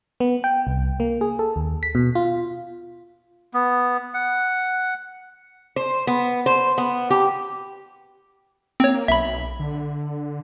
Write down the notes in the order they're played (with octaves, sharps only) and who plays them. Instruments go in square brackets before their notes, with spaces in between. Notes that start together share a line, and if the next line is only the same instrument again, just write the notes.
[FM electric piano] B3
G5
C2
A#3
G#4
A4
D#2
B6
B2
F4
[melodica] B3
F#5
[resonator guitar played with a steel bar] C5
B3
C5
B3
G4
[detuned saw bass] A#3 [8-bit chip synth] C4 C#5
[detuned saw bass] B1 [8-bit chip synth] E5 B5
[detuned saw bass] D3